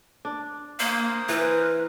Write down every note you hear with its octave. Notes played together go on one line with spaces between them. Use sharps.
D4
A#3 A#4 C5 D#6
E3 B4